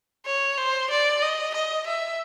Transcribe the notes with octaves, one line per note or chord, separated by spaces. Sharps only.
C#5
C5
D5
D#5
D#5
E5